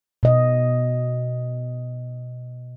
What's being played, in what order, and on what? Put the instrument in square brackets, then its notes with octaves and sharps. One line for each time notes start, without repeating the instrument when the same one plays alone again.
[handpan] B2 D#5